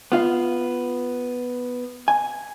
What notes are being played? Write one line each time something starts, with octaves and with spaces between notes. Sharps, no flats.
B3 F4 F5
G#5